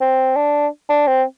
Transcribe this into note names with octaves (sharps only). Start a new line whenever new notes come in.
C4
D4
D4
C4